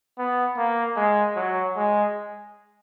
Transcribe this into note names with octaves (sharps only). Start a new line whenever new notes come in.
B3
A#3
G#3
F#3
G#3